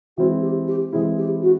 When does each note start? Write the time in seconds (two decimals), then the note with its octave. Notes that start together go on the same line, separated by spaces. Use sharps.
0.17 E3 G#3 C4 E4 F#4
0.42 G4
0.68 G4
0.93 E3 G#3 C4 E4 G#4
1.18 G4
1.42 F#4